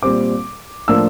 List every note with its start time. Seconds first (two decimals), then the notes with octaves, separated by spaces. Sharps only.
0.03 A#2 G3 C4 D6
0.88 A2 F3 A#3 D4 E6